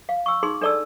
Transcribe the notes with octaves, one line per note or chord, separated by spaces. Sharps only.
F5
C#6 E6
D#4 G#4 C6
D4 A4 D5 A5 E6